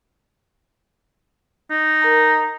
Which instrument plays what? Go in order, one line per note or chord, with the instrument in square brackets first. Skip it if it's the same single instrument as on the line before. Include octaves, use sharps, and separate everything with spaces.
[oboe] D#4
[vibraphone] A#4 A#5